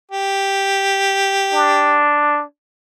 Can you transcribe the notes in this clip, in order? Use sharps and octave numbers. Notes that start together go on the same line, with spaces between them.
G4
D4